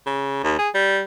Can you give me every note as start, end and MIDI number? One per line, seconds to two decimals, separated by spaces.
0.06 0.41 49
0.43 0.54 39
0.58 0.69 68
0.74 1.02 55